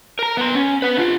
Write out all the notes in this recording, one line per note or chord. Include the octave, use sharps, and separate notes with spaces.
A#4 A#5
B3 C6
C#4
B4 F#5
D4 F4